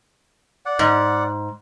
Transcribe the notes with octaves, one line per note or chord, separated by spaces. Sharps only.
D5 F#5
G#2